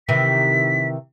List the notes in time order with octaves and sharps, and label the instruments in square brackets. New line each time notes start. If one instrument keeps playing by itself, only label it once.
[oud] C3 D#3 E3 [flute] B6